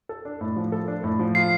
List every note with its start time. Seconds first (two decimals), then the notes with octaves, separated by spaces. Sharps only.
0.09 A4
0.25 D4
0.41 A2
0.56 F3
0.72 A4
0.88 D4
1.04 A2
1.19 F3
1.35 F4 C7